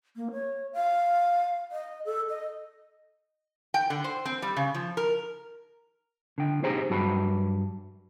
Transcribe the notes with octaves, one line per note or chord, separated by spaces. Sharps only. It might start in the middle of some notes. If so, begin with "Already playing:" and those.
A#3
C#5
F5
D#5
A4
D#5
G5
D3
C5
C4
G3
C#3
F3
A#4
D3 G5
D#4 G4 G#4 C5 G5 A#5
G2 F#3 F#4 A5 B5